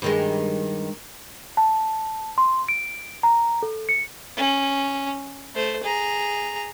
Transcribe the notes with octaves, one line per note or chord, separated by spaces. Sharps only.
G2 D#3 G#3
A5
C6
D7
A#5
A4
C#7
C#4
A3 C5
G#4 A#5